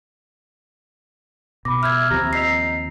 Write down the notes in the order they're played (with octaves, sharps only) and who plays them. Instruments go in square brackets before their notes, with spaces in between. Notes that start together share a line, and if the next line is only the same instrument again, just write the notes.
[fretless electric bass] B2 [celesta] B5 D6 [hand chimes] A#6
[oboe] E5 [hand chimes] F6 G6 G#6
[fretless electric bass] D#2 F3 C4 [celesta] G4 [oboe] A#5
[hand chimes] D#5 G6 C7 [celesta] E6 B6 F7